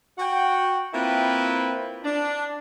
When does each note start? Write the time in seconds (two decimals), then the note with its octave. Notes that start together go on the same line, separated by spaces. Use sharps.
0.18 F#4 F#5 G5
0.93 A#3 C4 E4 F4 B4 G5
2.04 D4